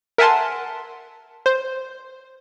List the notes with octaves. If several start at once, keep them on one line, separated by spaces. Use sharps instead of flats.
A#4 E5 F#5 G#5 A5 C6
C5